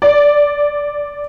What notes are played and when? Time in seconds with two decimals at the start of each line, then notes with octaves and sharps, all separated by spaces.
0.02 D5